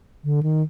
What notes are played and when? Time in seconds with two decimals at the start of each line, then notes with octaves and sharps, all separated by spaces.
0.24 D3
0.43 D#3